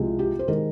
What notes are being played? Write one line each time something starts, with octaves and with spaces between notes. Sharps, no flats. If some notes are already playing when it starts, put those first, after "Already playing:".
Already playing: C2 C3 F3 G#3
G4
C5
D#3 G#3 A#4